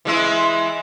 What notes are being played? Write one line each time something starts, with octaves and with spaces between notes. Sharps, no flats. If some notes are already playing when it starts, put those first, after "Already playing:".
E3 G#3 E4